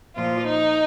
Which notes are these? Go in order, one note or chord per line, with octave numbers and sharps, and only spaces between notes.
A#2 F3 F4
D#4